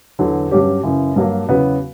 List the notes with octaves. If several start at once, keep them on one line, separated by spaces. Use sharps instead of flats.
E2 D3 F#3
G2 F#3 C#4 G4
F#2 C#3 E3
G2 F#3 A#3
E2 C#3 F#3 B3